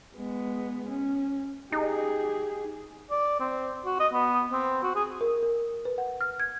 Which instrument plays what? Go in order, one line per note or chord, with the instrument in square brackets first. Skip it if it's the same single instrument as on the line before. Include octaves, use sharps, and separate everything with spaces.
[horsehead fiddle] G#3 B3
C#4
[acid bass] D#4 [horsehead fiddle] G4 G#4
[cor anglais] D5
C4
F#4
D#5
B3
C4
F#4
G#4
[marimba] A#4
A#4
B4
F#5
F6
G#6